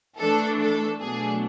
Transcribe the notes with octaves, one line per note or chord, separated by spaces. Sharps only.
E3 A3 D4 A4
A4
B2 F#3 A3 D4 G#4